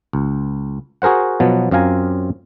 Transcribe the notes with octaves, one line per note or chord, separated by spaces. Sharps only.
C#2
F#4 G#4 A#4 C5 F#5
B2 F3 F#3 B3
F#2 C4 F4 F5 G#5 A#5